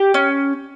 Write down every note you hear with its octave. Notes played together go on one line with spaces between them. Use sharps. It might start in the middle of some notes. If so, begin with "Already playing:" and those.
Already playing: G4
C#4